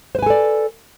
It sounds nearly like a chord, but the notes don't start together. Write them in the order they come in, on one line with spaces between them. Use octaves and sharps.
C5 B4 G#5 A4 D5